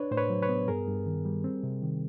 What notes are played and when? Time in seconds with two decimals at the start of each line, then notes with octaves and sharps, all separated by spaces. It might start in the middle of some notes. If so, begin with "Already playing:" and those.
Already playing: D4 B4 C#5
0.11 A2 C5
0.17 B4 C#5
0.30 F#3
0.43 B4 C#5
0.49 B3
0.68 G2 G#4 A#4
0.87 G2
1.06 D#3
1.25 G3
1.44 C4
1.63 C3
1.82 D#3